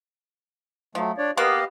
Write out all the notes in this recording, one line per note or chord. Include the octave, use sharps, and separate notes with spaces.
F3 F#3 A3
D4 C#5 D5
B2 A#3 B3 G4 D#5 F5